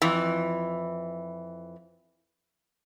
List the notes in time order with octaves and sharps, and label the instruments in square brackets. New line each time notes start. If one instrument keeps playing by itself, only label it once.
[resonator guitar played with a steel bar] F2 E3